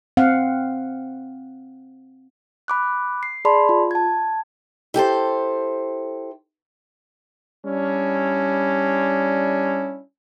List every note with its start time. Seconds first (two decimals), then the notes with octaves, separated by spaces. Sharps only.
0.17 C4 F5 F#5
2.68 B5 D6 F#6
3.23 C7
3.45 G#4 D5 A5 B5 C6
3.69 F4
3.91 A5 G#6
4.94 E4 G4 A4 C5
7.65 G3 C#4 D4 E4